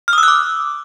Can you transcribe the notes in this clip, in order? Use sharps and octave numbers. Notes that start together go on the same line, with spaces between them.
F6
D#6
E6
F#6
D6